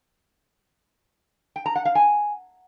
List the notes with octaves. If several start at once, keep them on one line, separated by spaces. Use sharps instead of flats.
G5
A#5
F#5
F5
G#5